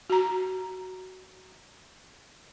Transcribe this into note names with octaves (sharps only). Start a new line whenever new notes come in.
F#4 A#5